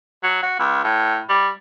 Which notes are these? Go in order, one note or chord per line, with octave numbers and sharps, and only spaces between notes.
F#3
F#4
C#2
A2
G3